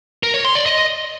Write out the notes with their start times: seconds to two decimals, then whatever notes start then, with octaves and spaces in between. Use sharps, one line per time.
0.23 A#4
0.34 C#5
0.45 C6
0.55 D5
0.66 D#5